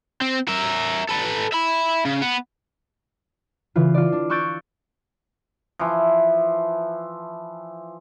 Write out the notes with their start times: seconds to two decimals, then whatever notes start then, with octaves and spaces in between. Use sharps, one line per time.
0.21 C4
0.48 A#4 E5
1.09 A4 B4
1.52 E5 B5
2.05 C#3
2.22 B3
3.76 C#3 E3 F4
3.94 F4 D5
4.12 D4
4.30 C#6 E6 F#6 G6 A6 D7
5.79 E3 F3